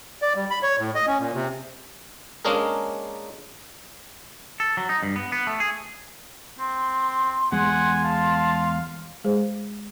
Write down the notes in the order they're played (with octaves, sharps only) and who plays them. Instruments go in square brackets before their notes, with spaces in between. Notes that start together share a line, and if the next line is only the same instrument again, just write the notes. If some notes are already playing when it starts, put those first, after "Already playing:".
[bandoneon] D5
G3
B5
C#5
A2
D#5
C#4
A#2
C3
[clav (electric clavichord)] G#3 A#3 C#4 D4 G#4 A#4
[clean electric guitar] A4
F#3
D#4
G2
B3
B3
A3
G#4
[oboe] C4 [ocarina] C6
[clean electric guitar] E2 G#3 [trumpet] F#5 [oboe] G#5
[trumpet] F5 [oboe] A5
[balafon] G#3 G#4 C5